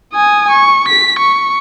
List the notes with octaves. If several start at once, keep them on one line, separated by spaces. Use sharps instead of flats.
G#5 D#6
C#6
B6
C#6